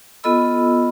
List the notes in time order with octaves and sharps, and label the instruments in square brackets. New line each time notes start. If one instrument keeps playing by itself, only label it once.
[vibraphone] B3 F4 A4 D#5 B5 E6